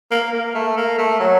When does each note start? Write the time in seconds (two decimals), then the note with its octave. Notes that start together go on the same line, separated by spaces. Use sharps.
0.11 A#3
0.33 A#3
0.54 A3
0.77 A#3
0.98 A3
1.20 F#3